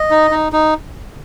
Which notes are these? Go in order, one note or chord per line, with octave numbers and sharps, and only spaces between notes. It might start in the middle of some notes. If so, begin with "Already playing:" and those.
Already playing: D#5
D#4
D#4
D#4